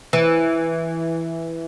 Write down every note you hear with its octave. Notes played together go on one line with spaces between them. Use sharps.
E3